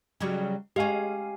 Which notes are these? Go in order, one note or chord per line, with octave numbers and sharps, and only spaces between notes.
C#3 F#3 G3
G#3 C#4 G4 F5 G#5